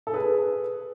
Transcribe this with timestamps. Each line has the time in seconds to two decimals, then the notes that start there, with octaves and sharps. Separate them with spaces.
0.07 A4
0.13 G#4 B4